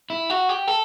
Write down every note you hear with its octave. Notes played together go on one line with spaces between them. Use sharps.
E4
F#4
G4
A4